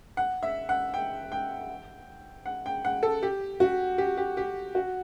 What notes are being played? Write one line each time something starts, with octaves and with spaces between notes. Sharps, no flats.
F#5
E5
F#5
G5
G5
F#5
G5
F#5
A4
G4
F#4
G4
G4
G4
F#4